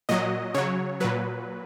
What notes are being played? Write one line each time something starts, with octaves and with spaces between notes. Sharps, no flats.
A#2 F#3 D#5
C#3 F#3 C#5
A#2 F#3 B4